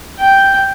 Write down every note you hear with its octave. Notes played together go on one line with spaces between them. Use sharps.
G5